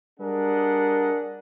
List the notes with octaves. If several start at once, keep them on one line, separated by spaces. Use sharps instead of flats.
G3 D4 G#4 A#4 D#5 F#5